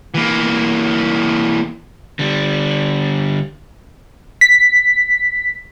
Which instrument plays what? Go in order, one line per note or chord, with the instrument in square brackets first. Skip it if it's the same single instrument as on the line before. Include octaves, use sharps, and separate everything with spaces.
[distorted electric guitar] E3 A#3
[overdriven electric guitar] D3 G3
[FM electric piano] B6